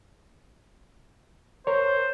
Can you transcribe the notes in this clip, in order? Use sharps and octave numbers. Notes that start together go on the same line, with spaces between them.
A#4 C5 C#5